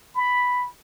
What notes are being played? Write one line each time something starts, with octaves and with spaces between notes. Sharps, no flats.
B5